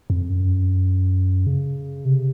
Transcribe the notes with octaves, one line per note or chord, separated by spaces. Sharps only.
F2
F#2
C#3
C3